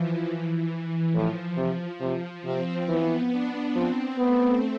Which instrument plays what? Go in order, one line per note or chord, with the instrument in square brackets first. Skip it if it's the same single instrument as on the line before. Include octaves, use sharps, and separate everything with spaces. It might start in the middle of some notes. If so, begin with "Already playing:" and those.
Already playing: [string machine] E3 F3
E3
[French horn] A2 [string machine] F3
[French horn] C3
[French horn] C3 [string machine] F3
[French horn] C3 [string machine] C4
[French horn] E3 [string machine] B3
[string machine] D4
[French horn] F3 [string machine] C4
[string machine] A3 [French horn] B3